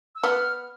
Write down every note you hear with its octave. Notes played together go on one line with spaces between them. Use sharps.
E6
B3 F6